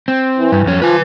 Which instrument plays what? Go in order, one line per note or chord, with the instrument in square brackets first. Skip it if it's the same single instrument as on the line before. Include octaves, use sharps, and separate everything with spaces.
[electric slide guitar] C4
[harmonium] E3
[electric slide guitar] G2
F2 C#4
[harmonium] F3 F4 [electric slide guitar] B4 G#5